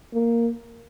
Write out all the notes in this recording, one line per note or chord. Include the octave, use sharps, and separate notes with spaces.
A#3